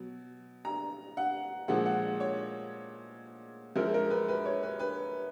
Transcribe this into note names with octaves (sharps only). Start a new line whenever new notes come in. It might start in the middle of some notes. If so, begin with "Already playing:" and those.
Already playing: B2 F#3
A#5
F#5
A#2 F3 G#3 F#5
F#5
C#5
F#2 F3 G#3 A#4
A#4
B4
B4
C#5
B4
B4